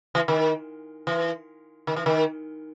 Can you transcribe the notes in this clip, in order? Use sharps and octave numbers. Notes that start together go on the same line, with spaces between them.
E3
D#3
E3
D#3
E3
D#3